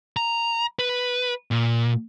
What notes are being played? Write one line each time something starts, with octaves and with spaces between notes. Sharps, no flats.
A#5
B4
A#2